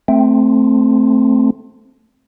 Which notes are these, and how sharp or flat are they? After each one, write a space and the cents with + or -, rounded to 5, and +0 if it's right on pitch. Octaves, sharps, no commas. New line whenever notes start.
A3 +0 C4 +0